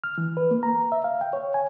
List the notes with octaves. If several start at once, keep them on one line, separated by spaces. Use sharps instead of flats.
F6
E3
B4
A#3
A#5
E5
F5
G5
C#5
G#5